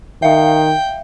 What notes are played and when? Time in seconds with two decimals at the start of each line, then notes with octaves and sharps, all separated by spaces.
0.22 D#3 E5 F5 G5